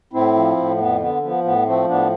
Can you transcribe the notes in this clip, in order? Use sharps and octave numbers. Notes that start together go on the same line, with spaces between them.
A2 C4 E4
F3
A2
F2 B3
D3 B3
F3 B3
A2 B3
F3 A3 C4
A2 B3 D4